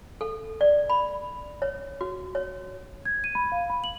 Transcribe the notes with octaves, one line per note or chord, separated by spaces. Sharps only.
A4
D5
B5
C#5
F#4
C#5
G#6
D#7
B5
F5
B5
F#7